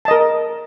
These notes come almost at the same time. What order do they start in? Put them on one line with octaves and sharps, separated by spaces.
A5 D#5 A#4